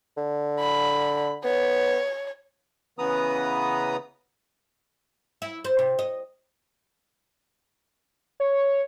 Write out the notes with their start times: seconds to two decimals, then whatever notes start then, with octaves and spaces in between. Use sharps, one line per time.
0.17 D3
0.60 B5
1.44 B3 C#5
2.99 C#3 E3 B3 B4 A#5 D#6
5.42 E4
5.64 C5
5.79 C3
5.99 D#5
8.40 C#5